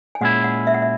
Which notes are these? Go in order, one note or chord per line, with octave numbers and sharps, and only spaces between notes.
G#5
A#2 G#3 C#4 E4 F#5
F#5
E5
F#5
E5